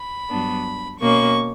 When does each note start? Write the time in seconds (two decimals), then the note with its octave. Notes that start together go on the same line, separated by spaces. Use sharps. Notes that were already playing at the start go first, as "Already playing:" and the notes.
Already playing: B5
0.28 G2 F#3 B3 D4
1.00 B2 A#3 C#4 C#6